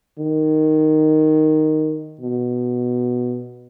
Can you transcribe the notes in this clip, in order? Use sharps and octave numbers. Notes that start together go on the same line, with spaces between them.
D#3
B2